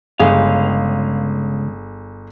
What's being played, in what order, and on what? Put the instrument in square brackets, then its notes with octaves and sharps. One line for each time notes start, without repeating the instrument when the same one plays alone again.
[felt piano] G1 G#4 [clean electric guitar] C#2 E3 F5